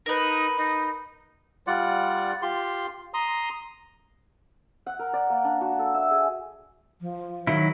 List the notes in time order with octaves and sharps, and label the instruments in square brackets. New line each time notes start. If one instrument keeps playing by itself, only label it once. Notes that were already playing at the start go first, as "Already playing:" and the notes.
[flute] D#4 [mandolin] A#4 B4
[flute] D#4
[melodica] G3 F4 D5 F#5
F4 G4 C6
A#5 C6 D#6
[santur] F#5
A#4
D5
A#3
D4
F#4
A4
E5
G#4
[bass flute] F3
[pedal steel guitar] D#3 F#3 E4